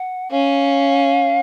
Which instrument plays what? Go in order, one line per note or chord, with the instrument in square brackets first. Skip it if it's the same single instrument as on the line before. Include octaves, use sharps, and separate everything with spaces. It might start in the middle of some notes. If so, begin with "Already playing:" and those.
Already playing: [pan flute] F#5
[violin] C#4 [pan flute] F5